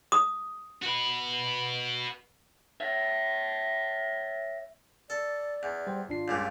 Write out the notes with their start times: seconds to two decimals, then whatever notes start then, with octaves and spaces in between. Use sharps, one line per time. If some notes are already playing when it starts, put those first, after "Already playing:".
0.12 D#6
0.82 F#4 B4
2.80 C#5 E5
5.10 A4 D5
5.63 E2
5.87 G3 C5 G5
6.09 G#1 D4 F4 C7
6.28 C#2 G2 A#2